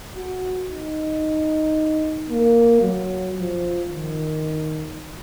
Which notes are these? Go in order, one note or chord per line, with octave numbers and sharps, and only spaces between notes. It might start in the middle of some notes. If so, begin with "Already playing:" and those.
F#4
D#4
A#3
F#3
F3
D#3